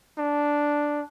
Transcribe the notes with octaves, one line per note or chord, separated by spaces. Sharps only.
D4